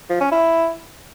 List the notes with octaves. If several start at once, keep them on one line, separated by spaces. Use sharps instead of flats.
F3
C#4
E4